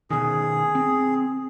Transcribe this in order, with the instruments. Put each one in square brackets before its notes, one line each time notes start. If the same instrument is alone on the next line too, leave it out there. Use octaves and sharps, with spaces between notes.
[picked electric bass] B2 D#3 [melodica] G#4
[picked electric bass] C4